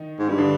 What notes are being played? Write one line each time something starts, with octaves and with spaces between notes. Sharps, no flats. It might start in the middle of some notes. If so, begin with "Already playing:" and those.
Already playing: D#3 D#4
G#2
G2
D3 D4